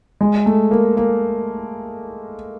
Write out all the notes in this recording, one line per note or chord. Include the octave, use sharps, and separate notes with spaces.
G#3
A3
A#3
A#3